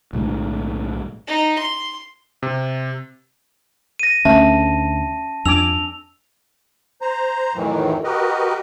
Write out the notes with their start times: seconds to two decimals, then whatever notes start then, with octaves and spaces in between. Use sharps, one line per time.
0.13 B1 A2 D3 G#3
1.28 D#4
1.59 C6
2.43 C3
3.99 A#6 D#7
4.25 D2 A3 C#4 E5 A5
5.45 F2 D4 G#5 D6 E6 F7
7.01 C5 A#5
7.55 F2 A2 D#3 E3 F#3
8.04 F#4 G4 A#4 B4 D#5